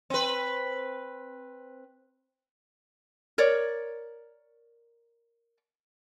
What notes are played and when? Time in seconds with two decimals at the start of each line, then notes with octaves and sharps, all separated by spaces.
0.10 C4 B4
3.38 A#4 C#5 D5